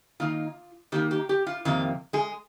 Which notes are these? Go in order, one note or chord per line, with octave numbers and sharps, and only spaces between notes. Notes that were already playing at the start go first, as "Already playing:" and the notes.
D#3 A#3 D#4 F4
D#3 A#3 D#4 G4
G4
G4
F4
F2 C3 D#3 A#3 F4
G#3 G#4